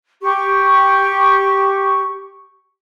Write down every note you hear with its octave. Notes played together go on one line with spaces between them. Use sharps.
G4 C#6